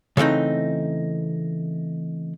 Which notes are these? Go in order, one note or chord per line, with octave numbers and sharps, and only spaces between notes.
C#3 E3 A3 C4 D#4